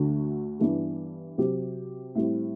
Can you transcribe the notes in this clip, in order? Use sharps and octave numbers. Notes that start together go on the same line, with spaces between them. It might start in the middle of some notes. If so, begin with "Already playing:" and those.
Already playing: D2 D3 A3 D4 F#4
G2 E3 B3 D4 G4
C3 F#3 C4 G4
A2 G3 C4